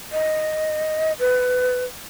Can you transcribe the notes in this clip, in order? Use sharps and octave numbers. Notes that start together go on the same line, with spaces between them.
D#5
B4